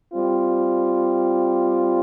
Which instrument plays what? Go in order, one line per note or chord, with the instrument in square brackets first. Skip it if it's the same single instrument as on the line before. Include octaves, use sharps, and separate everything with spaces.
[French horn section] G3 C4 F4